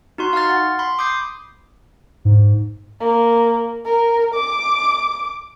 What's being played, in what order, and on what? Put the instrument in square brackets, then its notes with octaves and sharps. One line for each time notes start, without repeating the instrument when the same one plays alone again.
[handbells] D#4 F#4 C6 F#6
F5 C6 C#6 F6 A6
F#5
B5 C6
B5 D6 D#6 G6 C7
[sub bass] G#2
[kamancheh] A#3
A#4
D6